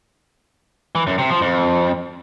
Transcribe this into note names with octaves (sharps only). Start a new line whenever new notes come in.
E3
F#2
C3
F3
F2